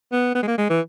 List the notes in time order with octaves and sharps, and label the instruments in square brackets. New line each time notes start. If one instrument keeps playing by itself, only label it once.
[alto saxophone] B3
B3
G#3
A#3
G#3
E3